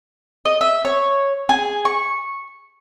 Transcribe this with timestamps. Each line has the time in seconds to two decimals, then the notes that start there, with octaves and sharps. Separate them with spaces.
0.45 D#5
0.61 E5
0.85 C#5
1.49 G#4
1.85 C#6